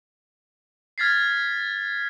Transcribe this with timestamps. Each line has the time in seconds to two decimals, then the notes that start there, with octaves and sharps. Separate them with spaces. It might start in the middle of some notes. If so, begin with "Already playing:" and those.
0.98 F6 G#6 A6 B6 C7